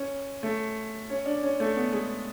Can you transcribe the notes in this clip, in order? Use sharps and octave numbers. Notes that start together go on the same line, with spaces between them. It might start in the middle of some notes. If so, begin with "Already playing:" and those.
Already playing: C#4
A3
C#4
D4
C#4
A3
B3
G#3